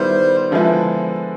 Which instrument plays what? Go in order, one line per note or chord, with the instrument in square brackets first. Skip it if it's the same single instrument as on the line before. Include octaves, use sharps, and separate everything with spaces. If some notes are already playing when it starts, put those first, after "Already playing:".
Already playing: [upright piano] D#3 G3 B3 E4 [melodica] C5
[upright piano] D3 F3 G#3 B3 E4